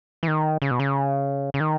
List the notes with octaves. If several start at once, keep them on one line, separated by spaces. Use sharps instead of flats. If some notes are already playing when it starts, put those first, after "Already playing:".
E3
D#3
C#3
B2
C#3
C#3
D#3